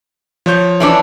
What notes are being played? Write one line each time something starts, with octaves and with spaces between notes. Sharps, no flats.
F3 C#5 G6
E3 C#4 D4